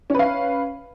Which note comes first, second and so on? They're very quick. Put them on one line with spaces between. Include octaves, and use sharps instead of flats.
C#4 B4 F5